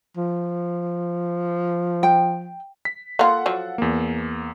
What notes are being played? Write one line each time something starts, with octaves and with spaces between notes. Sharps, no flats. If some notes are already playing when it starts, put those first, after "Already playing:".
F3
G5
B6
A#3 F4 A4 F5 F#5
F3 F#3
E2 A#3